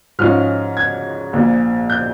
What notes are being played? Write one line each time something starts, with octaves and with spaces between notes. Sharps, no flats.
G#2 F3 G#3 C#4 F4 F6
G#6
A#1 A#2 F3
G6